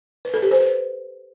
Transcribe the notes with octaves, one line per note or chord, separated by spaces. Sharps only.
B4
A4
G4
C5
B4